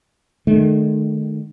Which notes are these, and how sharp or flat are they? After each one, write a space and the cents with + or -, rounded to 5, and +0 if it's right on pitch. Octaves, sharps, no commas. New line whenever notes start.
D#3 -40 A3 -35